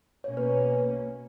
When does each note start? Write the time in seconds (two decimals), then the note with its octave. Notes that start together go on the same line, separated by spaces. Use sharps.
0.24 B2 A#3 C#4 C#5
0.37 B4
0.50 C#5